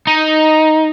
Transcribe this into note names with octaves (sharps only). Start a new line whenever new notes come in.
D#4